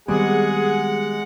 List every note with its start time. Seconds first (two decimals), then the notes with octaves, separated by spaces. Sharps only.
0.08 D#3 G3 G#3 B3 C4 G#4 F#5